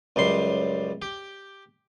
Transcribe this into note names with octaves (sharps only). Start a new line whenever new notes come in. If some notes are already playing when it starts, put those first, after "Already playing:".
C#2 F#2 G3 C6
G4